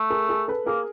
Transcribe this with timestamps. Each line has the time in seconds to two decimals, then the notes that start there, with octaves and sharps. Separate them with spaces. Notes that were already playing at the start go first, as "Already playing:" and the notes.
Already playing: A3
0.10 G#4 A#4
0.29 G#4 A#4
0.48 A4 B4
0.67 A#3 G#4 A#4